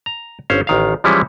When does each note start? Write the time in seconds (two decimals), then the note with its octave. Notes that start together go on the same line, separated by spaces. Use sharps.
0.06 A#5
0.50 G1 C#4 C5 F5
0.67 A1 D#3 F5
1.04 E3 F3 G3 G#3 C#4 E4